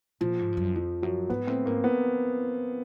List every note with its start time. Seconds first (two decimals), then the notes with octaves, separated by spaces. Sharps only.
0.21 A#2 F3
0.39 G#2
0.52 G2
0.57 F#2
0.75 F2 F3
1.02 F#2 F#3
1.30 G#2 B3
1.47 A2 C4
1.66 G#2 A#3
1.84 B3